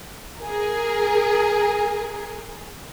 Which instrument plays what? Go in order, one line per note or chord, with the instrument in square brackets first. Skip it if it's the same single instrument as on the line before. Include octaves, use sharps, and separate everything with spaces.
[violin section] G#4 A#4